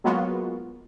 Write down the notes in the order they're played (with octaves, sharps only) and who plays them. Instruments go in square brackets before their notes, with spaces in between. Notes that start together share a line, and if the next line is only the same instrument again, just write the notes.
[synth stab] F#3 G#3 A#3 B3 F4 F#4